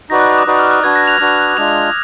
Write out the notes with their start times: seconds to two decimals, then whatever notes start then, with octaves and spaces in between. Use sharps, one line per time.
0.10 D#4 F#4 B4 D5 A#6
0.20 F#6
0.29 D#6
0.38 D6
0.47 D#4 F#4 B4 D5 D#6
0.59 F6
0.71 F#6
0.83 D4 F#4 B4 G#6
0.96 A#6
1.07 F7
1.20 D4 F#4 B4
1.57 G#3 D4 F4 F7